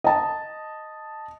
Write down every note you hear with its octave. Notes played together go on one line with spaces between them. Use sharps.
D#5 A5